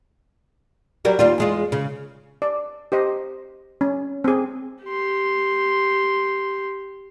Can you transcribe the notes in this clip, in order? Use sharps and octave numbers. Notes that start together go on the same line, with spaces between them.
F#3 G3 A#4
D#2 G3 F4
E2 G#3 F4
C#3
D5
G4 C5 D#5
C#4
C4 G#4
G4 C6